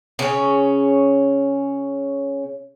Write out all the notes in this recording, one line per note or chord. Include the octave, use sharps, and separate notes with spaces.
C#3 C#4